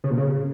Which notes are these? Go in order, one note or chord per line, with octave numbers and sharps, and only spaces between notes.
C#3
A#2
C#3